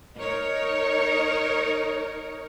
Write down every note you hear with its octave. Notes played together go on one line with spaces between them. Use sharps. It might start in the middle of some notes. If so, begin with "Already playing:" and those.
D#4 A#4 C#5